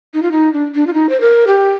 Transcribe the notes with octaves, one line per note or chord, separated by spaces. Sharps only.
D#4
F4
D#4
D4
D4
F4
D#4
C5
A#4
G4